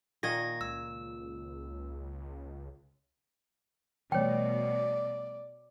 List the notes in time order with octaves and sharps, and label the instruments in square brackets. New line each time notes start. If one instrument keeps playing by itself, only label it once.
[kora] A#2 D#3 D#5 [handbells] G#6 A#6
[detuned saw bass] C#2 [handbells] E6
[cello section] B2 [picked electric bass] E3 G3 A3 [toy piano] C#5 G5 [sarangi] D5